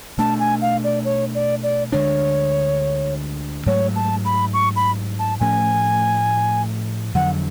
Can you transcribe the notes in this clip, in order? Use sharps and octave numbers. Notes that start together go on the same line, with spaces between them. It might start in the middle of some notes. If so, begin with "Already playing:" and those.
B2 A3 D4 A5
G#5
F5
D5
C#5
D5
D5
D2 D3 G#3 D4 C#5
G#2 F#3 A3 C#5
A5
B5
C#6
B5
A5
A2 F3 A3 C#4 G#5
F2 D3 F#3 F#5